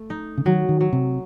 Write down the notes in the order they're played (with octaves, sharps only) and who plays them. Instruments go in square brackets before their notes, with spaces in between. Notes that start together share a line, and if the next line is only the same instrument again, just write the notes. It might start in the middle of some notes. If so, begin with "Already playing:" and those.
Already playing: [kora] A3
D#4
[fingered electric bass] C#3
[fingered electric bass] D#3 [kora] F#3
[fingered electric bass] D#3
[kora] F#3
[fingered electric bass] C3